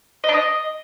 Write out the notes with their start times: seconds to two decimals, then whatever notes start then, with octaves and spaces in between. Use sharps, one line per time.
0.24 D#5
0.29 D4
0.34 D#5